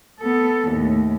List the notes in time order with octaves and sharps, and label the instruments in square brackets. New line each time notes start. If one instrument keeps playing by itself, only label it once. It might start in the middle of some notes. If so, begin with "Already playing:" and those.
[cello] B3 A4
D#2 A2